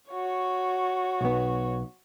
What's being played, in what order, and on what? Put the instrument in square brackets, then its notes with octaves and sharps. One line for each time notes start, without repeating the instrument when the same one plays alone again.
[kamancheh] F#4 C#5
[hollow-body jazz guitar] B1 B3